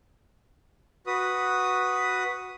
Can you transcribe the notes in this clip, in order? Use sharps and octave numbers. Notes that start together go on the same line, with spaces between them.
F#4 B4 D#6